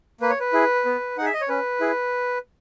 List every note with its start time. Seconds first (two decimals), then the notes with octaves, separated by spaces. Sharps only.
0.21 A#3 B4
0.30 C#5
0.40 B4
0.53 E4 G#4
0.85 B3
1.17 D#4 F#5
1.21 G#4 E5
1.33 D#5
1.41 C#5
1.49 C#4 B4
1.81 E4 G#4